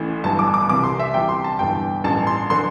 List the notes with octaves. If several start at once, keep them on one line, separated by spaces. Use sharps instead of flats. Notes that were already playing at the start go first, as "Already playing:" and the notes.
Already playing: A1 A2 E3
G1 G2 E3 A5
D6
D6
C2 C3 E3 D6
C6
E5
C2 C3 E3 G5
C6
A5
G1 G2 E3 G5
A1 G2 E3 A5
C6
D3 C6